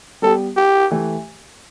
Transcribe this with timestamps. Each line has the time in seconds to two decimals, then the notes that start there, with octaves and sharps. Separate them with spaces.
0.22 G3 B3 G4 A4
0.56 G4
0.91 E3 A3 G4